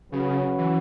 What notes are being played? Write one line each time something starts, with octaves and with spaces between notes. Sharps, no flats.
C#3 F#3 C#4 F#4 B4
E3